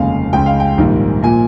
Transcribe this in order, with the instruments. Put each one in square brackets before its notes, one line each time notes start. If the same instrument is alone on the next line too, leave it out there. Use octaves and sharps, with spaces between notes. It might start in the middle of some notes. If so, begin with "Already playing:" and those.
Already playing: [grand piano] F1 D#2 C#3 G#3 F5
C#2 C#3 G#3 G5
F5
G5
A#1 G#2 D#3 G3 A#3
A#2 F3 A#3 G#5